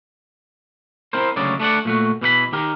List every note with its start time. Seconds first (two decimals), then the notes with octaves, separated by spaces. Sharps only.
1.13 C4 E4 A#4 C5
1.36 D2 C#3 F#3 G#3 D5
1.60 A3 D4 D5 F#5
1.85 A#2 A3 F#4
2.22 B2 E3 F#5 B5
2.53 D#3 G4 A#4